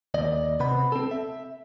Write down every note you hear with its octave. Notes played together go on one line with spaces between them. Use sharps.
D#2 D5 D#5
C3 B3 B5
C4 A4
E5